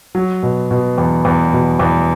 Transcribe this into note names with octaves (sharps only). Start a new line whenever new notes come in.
F#3
B2
B2
E2
E2
B2
E2